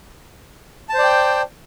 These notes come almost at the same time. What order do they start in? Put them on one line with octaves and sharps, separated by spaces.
A5 C5 D5 G5